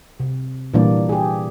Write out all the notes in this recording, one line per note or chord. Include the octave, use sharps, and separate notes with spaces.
C3
A#2 E3 G3 A#3 D4 D5
G4 G#4